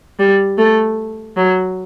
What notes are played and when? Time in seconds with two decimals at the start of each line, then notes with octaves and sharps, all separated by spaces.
0.19 G3
0.58 A3
1.37 F#3